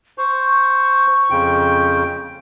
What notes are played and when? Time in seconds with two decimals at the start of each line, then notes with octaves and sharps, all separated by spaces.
0.18 C5 C#6
1.30 F2 C#3 G5